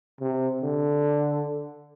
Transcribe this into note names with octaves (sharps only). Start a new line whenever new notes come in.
C3
D3